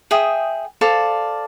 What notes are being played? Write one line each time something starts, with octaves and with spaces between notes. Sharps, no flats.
G#4 E5 G5 D#6
A4 C5 D5 F5